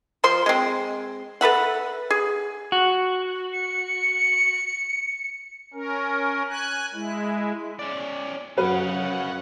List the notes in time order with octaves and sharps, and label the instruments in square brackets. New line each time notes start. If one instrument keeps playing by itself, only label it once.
[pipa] F3 C5 C6
G#3 C4
A4 B4 E5 F#5
G#4
[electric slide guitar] F#4
[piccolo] C#7
[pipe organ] C#4 A#4
G#5 F#6
G#3 E4
[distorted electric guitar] C#4 D5
[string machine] F#2 F#5 [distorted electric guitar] C#4 F5 [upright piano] F#4 B4